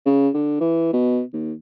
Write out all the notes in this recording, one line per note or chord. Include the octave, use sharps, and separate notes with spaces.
C#3
D3
E3
B2
D#2